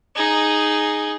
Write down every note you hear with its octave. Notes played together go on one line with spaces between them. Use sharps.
D#4 G#4